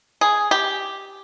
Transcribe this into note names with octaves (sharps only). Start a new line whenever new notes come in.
G#4
G4